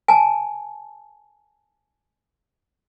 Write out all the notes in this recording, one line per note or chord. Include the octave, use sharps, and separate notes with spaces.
G#5 A5